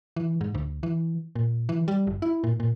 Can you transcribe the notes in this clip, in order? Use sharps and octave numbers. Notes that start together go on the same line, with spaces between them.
E3
G#2
D2
E3
A#2
E3
G3
G1
E4
A#2
A#2